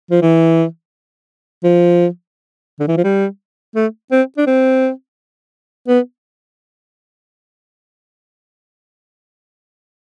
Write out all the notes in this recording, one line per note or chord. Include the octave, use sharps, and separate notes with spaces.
F3
E3
F3
D3
E3
F3
G3
A3
C4
D4
C4
B3